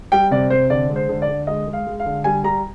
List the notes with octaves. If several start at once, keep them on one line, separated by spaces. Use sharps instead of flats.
G3 G5
C3 D5
C3 C5
D3 D5
G#3
C5
D3
D5
D3
G#3 D#5
G#3
F5
G#3
F5
D3
G3 G#5
G3 A#5